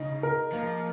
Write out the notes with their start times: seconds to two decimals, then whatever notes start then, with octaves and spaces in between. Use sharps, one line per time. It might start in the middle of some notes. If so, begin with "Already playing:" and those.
Already playing: C#3 D#4
0.23 A#4
0.52 F3 A#3